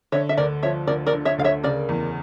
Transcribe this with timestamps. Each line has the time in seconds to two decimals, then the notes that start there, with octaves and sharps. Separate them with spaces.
0.12 D3 C#5 E5
0.29 E5
0.37 D2 A#4 D5
0.63 F3 C#5 E5
0.87 D2 A#4 D5
1.06 A#4 D5
1.13 D3
1.25 C#5 E5
1.38 D2 F5
1.44 C#5 E5
1.63 C#3 A#4 D5
1.89 E2